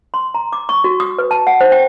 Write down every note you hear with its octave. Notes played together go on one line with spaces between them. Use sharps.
C6
A#5
D6
C#6
F#4
D#6
B4
A5
F#5
C5
G5